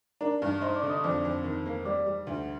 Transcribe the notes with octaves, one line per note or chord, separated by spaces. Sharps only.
D4 A#4 A#5
G2
D#4 C5 C6
D5 D6
D3
D#5 D#6
F2 D5 D6
F2
D#3
A#3
G3 D5 D6
G3
D2